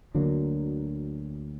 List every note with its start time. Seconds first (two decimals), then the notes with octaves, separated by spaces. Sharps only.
0.15 D2 D3 F#3 A#3